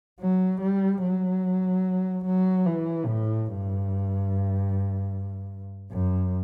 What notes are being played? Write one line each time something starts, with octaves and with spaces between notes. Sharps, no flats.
F#3
G3
F#3
F#3
E3
A2
G2
F#2